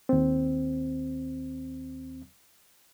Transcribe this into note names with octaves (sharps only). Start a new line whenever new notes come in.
D#2 C4